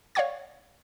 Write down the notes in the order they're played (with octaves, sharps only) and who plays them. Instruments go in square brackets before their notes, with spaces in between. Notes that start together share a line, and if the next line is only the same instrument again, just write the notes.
[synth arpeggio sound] C#5 D5 F5 F#5 C#6 G#6